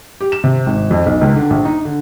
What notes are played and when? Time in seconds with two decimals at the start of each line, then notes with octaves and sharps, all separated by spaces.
0.21 G4
0.32 E7
0.44 C3
0.66 G#1
0.91 F2
1.06 B1
1.21 C#2
1.36 D3
1.50 A#1
1.65 D#4
1.85 D3